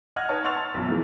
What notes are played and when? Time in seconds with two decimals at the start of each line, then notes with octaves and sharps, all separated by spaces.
0.16 D#5 F#5 F6 F#6 G#6
0.29 D#4 B4 C#5 A5
0.44 F#5 C6 C#6 E6 A6 F7
0.57 A5
0.74 B1 F#2 F3
0.88 E3 G#3 A3